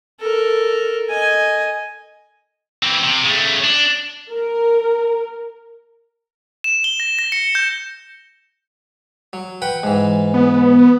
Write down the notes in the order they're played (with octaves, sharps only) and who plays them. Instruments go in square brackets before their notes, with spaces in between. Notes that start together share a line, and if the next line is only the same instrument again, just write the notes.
[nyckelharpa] A4 A#4
D#5 G#5
[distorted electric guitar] E3 C4
C3
C#3 A3
D4
[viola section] A#4
[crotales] E7
G7
A#6
A#6
C#7
G6
[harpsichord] F#3
B4 F#5 G5
G#2 E3
[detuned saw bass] B3